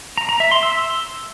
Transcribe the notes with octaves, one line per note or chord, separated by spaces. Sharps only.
A#5
A#5
E5
C6
E6